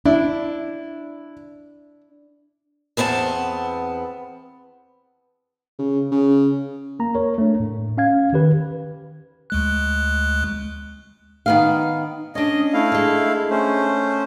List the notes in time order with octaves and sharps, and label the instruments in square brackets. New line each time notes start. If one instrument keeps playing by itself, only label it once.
[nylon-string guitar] D4 [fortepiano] E4
[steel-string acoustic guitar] E2 B3 C4 E5 A5
[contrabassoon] C#3
C#3
[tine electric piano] A#3 A#5
A#4 C#5
A3 D4
A2
C#4 F5 G#6
D#3 G4 B4
[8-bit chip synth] D2 G#3 F#6
[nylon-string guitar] D#3 B3 F5
[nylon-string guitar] C#4 D4 [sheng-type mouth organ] D#5
[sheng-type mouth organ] A3 E4 F5
[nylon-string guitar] G#3 D4
[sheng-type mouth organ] A3 C#4 C5